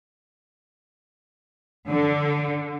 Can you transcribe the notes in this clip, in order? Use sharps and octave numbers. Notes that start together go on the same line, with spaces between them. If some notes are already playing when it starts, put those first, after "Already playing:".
D3